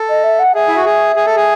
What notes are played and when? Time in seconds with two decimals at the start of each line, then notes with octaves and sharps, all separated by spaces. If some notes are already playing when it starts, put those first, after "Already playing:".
Already playing: A4
0.09 D#5
0.24 E5
0.39 F#5
0.55 G#4 E5
0.68 E4
0.76 F#4
0.86 G#4
1.16 G#4
1.26 A4
1.36 G#4